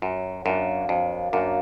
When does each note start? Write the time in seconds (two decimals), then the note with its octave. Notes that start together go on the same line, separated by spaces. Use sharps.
0.02 F#2 F#3
0.45 F#2 A#3 D4 F#4
0.89 F2 F#3
1.33 F#2 A#3 D4 F#4